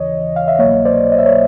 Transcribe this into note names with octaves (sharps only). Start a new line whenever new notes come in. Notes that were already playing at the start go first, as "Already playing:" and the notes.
Already playing: D#2 C#3 E3 C#5 D#5
F5
E5
C2 B2 F#3 A#3 C#5 D#5
C5 D5
D#5
E5
C#5 D#5